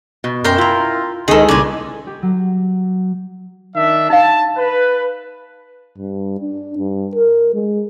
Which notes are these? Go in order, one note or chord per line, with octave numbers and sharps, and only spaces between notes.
B2
F#2 A#4 G5 C6
E4 F4 A#5
C#2 D#3 D#4 G#4 A4
C2 A#2 C#3 D5 G#5
G4
F#3
D#3 D4 E5
D#4 F5 A5
B4
G2
D4
G2
A#4
G#3